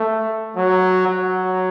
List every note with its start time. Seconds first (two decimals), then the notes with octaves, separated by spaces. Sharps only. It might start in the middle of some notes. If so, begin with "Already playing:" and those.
Already playing: A3
0.57 F#3
1.08 F#3